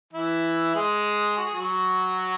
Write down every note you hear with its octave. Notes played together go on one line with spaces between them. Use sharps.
E3 E4
G#3 G#4
F#4
G#4
F#3 F#4